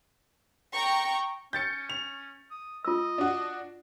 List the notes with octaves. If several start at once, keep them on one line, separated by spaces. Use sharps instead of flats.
G5 A#5 C#6
C#4 G6 A6 C#7
F7
D#6
F4 D#5 E6
D4 F#4